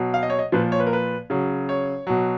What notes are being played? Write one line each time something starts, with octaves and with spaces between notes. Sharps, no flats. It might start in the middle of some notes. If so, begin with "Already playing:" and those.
Already playing: B2 F#3
F5
D#5
C#5
D#5
A#2 F3 B4
C#5
B4
A#4
B4
C#3 F#3
C#5
B2 F#3